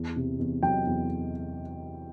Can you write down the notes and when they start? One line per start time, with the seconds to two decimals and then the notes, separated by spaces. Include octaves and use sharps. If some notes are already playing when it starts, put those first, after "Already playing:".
Already playing: E2
0.16 C3
0.39 E2
0.63 F#3 G5
0.86 E2